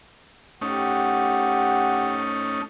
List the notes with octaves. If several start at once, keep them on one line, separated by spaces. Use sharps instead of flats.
A3 C#4 D#4 G4 F#5